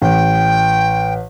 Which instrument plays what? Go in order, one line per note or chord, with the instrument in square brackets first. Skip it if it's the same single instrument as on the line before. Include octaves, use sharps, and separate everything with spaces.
[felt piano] A1 [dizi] G5